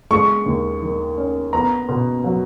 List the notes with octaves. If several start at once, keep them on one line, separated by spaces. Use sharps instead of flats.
G#3 C#6
D#2
D#3
C#4
B3 A#5
B2
F#3